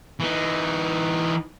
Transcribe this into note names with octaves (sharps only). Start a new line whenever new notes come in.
E3 D#4